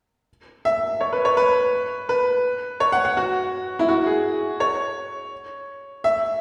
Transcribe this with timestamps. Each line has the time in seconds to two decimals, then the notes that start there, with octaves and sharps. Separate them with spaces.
0.65 E5
1.01 C#5
1.13 B4
1.25 C#5
1.37 B4
2.09 B4
2.80 C#5
2.92 F#5
3.05 F#5
3.17 F#4
3.79 E4
3.89 F#4
4.06 G#4
4.60 C#5
6.04 E5